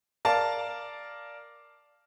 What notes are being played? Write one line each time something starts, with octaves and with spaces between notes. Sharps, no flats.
A#4 D5 F5 A5